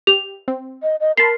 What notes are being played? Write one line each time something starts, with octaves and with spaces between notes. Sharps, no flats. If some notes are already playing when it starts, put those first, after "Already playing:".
G4 F7
C4
D#5
D#5
A#4 A5 B5 C6 C7